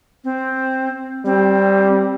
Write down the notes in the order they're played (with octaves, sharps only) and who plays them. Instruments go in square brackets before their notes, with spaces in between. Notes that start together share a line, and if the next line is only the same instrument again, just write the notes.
[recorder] C4
[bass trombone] G3 [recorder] C4